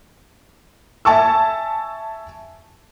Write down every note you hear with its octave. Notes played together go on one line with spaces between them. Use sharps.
E5 G#5 A5 C#6 E6